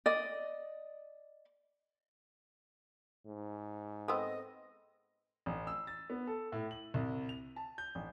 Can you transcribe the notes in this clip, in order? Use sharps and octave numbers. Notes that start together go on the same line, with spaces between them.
D5 D#5
G#2
B3 C4 A4 D#5 E6
A1
E6
A6
B3
A4
A2
F#7
C2
F7
A5
G6
A1